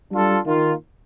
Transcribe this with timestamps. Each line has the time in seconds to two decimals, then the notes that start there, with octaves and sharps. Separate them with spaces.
0.10 G3 D4 F4 A4
0.45 D#3 A#3 F4